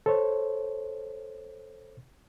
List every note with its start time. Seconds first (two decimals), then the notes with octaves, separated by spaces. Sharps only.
0.06 A4 C5 C#5